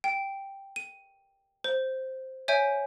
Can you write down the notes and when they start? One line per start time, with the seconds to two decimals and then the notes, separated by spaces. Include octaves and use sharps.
0.04 G5
0.76 D#7
1.64 C5
2.48 C#5 E5 G#5 G6 D7